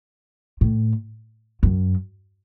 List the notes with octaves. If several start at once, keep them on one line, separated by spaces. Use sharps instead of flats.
A2
F#2